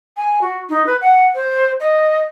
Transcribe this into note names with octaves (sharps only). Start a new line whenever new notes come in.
G#5
F#4
D#4
B4
F#5
C5
D#5